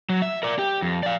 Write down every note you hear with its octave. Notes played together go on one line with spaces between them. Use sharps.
F#3
E5
A#4 D5
G4
F2
D5 F5